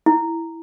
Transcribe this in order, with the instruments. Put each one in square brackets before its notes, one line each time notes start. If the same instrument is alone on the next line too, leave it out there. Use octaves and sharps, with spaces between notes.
[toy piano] E4